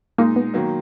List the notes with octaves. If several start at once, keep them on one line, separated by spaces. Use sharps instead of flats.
A#2 G#3 A#3 D#4
B3
D#3 F#3 A#3 B3